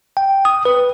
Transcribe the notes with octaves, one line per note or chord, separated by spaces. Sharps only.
G5
D#6
B4